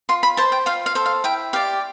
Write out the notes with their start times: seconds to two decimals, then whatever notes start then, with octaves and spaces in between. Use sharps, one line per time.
0.09 F4 C6
0.23 B5
0.37 C5 A5
0.52 G5
0.66 F4 F5
0.86 F5
0.95 A4 C5
1.06 F5
1.24 E4 G5
1.53 G4 D5 F5